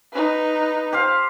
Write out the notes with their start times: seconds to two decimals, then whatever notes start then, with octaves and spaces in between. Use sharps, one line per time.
0.13 D#4 B4
0.93 G4 C5 F5